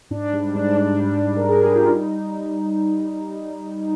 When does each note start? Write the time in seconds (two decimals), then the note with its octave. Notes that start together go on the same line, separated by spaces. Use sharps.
0.11 G#2 D4
0.33 G3
0.55 G#2 D4
0.77 G3 D4
0.99 G3 D4
1.22 G#2
1.36 A#4
1.43 G3
1.48 G#4
1.62 G3 G4
1.75 F4
1.87 D#4